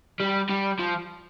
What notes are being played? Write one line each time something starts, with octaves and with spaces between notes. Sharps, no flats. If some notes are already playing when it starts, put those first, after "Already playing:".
G3
G3
F3